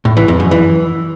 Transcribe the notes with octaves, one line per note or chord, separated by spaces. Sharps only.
A2
E3
F2
F#2
E3